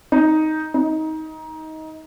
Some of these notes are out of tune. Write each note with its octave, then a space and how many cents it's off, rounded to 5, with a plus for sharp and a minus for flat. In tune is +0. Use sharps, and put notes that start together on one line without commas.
D#4 +5
D#4 +20